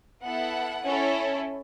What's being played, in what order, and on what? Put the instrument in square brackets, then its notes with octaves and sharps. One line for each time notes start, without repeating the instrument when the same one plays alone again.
[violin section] B3 E4 A4 F#5
C#4 E4 A4